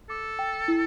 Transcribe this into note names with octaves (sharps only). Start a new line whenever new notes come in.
A4 D6
G5
E4